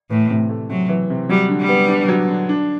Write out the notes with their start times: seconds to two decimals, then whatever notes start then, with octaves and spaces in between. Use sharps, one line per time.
0.10 A2 E3
0.30 C3
0.49 A3
0.70 C3 F#3
0.89 E3
1.10 C3
1.29 F#3 G3
1.49 D3
1.59 G3
1.69 B3
1.88 D4
2.08 F#3
2.28 D3
2.49 D4